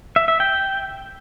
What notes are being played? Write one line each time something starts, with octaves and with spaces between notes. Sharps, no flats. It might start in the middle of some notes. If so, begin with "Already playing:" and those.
E5
E5
G5